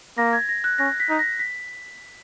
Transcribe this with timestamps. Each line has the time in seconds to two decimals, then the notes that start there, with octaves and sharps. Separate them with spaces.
0.18 A#3 A#6
0.33 G#6
0.49 A#6
0.64 F#6
0.78 C#4 A#6
1.00 B6
1.09 D#4
1.19 A#6
1.40 B6